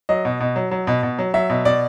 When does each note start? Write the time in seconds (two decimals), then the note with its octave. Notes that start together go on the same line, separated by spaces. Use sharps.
0.09 F#3 D#5
0.25 B2
0.40 B2
0.56 F#3
0.71 F#3
0.87 B2
1.03 B2
1.19 F#3
1.34 F#3 E5
1.50 B2
1.65 B2 D5